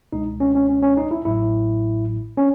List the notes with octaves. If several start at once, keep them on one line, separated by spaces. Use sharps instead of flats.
C#2 B2 G#3 D#4
C#4
C#4
C#4
C#4
D#4
E4
A1 A2 F#3 E4
C#4